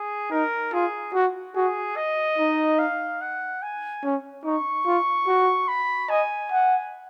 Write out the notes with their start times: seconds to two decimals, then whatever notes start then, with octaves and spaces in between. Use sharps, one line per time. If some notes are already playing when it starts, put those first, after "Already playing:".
Already playing: G#4
0.31 D#4 A#4
0.73 F4 G#4
1.14 F#4
1.56 F#4 G#4
1.96 D#5
2.38 D#4
2.79 F5
3.21 F#5
3.62 G#5
4.03 C#4
4.45 D#4 C#6
4.86 F4
5.27 F#4
5.68 B5
6.09 D#5 G#5
6.51 F#5